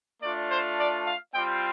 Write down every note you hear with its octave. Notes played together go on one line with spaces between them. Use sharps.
A3 D4 F4 D5
C5
D5
F5
G3 C4 F4 G5